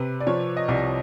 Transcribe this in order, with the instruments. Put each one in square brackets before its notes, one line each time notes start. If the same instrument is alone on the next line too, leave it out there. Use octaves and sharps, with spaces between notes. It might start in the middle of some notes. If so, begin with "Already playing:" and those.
Already playing: [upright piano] C3 B4
D5
F3 C#5
D#5
C2 D5